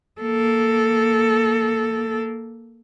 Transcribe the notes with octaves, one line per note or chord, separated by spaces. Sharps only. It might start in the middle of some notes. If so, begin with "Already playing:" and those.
A#3 A4